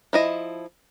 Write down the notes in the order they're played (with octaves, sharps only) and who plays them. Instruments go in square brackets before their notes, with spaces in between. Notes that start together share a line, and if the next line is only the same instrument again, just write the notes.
[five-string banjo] F3 E4 D#5